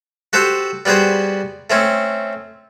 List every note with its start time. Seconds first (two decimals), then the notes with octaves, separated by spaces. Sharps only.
0.33 F#4 G4 A4 C5 F#5
0.85 G3 B3 F#4 G#4 C5
1.70 A3 C4 C#4